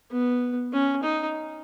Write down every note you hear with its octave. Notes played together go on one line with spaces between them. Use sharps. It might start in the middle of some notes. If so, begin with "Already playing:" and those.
B3
C#4
D#4